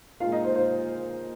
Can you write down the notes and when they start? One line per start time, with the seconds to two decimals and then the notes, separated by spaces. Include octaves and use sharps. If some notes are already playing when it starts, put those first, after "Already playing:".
0.20 A#2 G#3 D#4 F4 F5
0.32 D#4 D#5
0.44 C5
0.55 C5